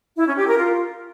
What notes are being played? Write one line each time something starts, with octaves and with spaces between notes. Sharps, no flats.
E4
C#4
G4
A#4
F4